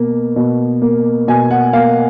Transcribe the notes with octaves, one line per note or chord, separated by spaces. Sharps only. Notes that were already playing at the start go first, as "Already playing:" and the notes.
Already playing: B2 A#3
B2
A#3
B2 G#5
F#5
A#3 F5